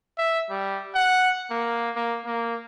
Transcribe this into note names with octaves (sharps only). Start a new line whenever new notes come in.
E5
G3
F#5
A#3
A#3
A#3